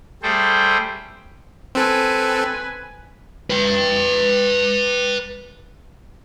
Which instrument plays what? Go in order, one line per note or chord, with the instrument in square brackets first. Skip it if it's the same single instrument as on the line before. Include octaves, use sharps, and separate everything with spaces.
[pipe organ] G3 A3 G#4 A4 C5 G5
[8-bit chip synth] C4 A4 [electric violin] B4 G#5
[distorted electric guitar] B4 G5